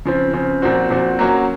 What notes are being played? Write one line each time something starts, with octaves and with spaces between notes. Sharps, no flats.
C#3 F3 C4
C#3 F3 C4
A#2 F3 C4 F#4
A#2 F3 C4 F#4
F#3 A#3 C#4 F#4